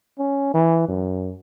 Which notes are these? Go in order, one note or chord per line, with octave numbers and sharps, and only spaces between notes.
C#4
E3
F#2